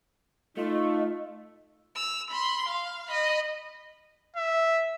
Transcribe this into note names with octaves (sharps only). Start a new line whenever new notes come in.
A3 D#4 F4 D#5
E6 F7
B5 C6
F5
D#5 B5
E5